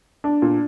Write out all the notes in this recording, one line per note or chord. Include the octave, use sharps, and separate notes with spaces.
D4
A#2